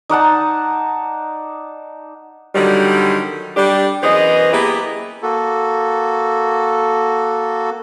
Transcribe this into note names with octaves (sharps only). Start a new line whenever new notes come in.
D#4 D5 F#5 A5
D3 D#3 F#3 G3
G3 D4 G4
F#2 E3 B3 G#4 C5 D#5
A#3 B3 E4 G4 G#4 B4
A#3 F#4 A4